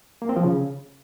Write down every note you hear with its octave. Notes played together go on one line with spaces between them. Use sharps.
A#3
C4
F3
C#3